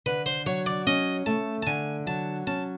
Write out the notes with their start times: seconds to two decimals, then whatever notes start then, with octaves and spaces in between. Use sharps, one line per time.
0.06 D3 B4
0.26 C5
0.46 F#3 C#5
0.66 D5
0.87 C#4 D#5
1.26 A3 A5
1.62 A5
1.66 D3 G#5
2.06 F#3 A5
2.47 C#4 A5